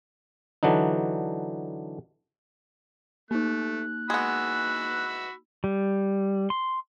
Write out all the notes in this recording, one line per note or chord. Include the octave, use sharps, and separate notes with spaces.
D3 E3 F#3 D4 D#4
A3 A#3 D#4 F#6
G#3 B3 F#4 B5 E6
G3
C6